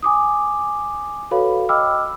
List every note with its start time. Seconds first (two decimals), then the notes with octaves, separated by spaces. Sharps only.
0.03 G#5 D6 D#6
1.31 F#4 A4 B4 C#5 F5 B5
1.69 D#5 G5 B5 D6 E6 F6